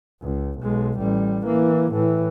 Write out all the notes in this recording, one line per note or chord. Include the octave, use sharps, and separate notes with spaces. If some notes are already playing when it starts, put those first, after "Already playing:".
C#2
B1 G#3
A1 G3
E3 A#3
A2 E3